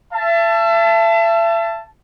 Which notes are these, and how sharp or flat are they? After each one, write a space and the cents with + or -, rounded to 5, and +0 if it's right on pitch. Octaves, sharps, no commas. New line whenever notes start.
E5 +40 A5 +0